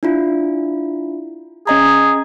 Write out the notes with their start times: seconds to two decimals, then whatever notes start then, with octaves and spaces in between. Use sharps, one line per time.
0.03 D4 E4 F4
1.67 C#4 G#4 D#5 A#5